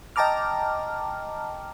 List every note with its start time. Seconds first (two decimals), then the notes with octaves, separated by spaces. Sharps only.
0.16 D#5 G5 A5 A#5 D6 F6